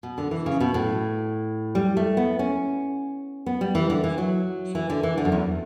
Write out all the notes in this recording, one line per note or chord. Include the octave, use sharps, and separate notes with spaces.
B2
D3
E3
C#3
B2
A2
G3
A3
B3
C#4
B3
G3
E3
D3
E3
F#3
E3
D3
E3
D3
F#2
E2